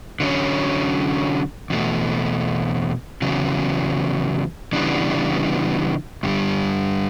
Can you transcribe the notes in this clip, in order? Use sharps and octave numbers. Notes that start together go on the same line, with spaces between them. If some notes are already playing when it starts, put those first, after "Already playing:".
D3 F#3 C#4
E2 B2 A3
E2 C#3 F#3
C#3 E3 G3 B3 D4
G2 D3 G3